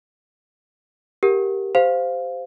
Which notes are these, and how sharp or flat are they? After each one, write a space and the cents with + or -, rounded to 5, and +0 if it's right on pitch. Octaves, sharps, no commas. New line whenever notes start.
G4 +0 A#4 +0 F#5 +0
G4 +0 C5 -15 F5 +0